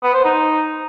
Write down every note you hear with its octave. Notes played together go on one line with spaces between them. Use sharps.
B3
C5
D#4